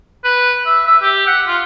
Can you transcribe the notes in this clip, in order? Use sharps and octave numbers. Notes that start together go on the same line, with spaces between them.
B4
E5
E5
G4
F#5
F4